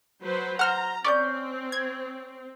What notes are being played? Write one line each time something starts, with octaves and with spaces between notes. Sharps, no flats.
F#3 B4 C5
C5 F#5 A#5 F6
C4 C#4 D5 C#6 G6
G#6